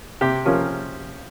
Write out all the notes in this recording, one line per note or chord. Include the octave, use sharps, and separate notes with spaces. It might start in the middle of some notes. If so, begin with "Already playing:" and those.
C3 G4
F3 A#3 C#4